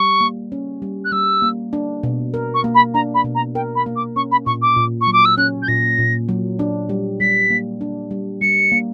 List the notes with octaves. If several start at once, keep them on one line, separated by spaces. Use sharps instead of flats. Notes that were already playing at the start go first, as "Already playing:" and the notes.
Already playing: G3 C#6
A#3
C#4
G3
F#6
G3 E6
A#3
D4
B2
A#4
C#6
A#3
B5
D4 A#5
B5
B2
A#5
A#4 G5
B5
A#3
D6
C#4 C#6
B5
A#2 C#6
D6
A#2
C#6
F#3
D6
E6
C#4 F#6
G6
A#2 A#6
A#2
F#3
D4
G3
G3 B6
A#3
D4
G3
G3 C#7
A#3